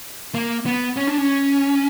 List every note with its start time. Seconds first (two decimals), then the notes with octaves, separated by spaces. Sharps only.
0.35 A#3
0.66 B3
0.97 C#4
1.07 D4
1.18 C#4